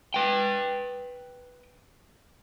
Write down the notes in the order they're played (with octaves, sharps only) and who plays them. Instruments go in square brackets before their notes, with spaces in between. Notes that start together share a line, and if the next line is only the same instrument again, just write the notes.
[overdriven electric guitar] B4 G5